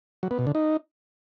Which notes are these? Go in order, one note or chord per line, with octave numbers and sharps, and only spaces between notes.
F#3
B3
B2
D3
D#4